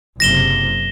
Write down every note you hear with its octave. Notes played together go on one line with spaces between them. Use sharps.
F#1 C3 A#6 E7 G7